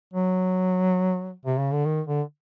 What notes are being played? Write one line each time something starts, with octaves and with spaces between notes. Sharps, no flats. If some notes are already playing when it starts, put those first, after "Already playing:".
F#3
C3
C#3
D3
D#3
D3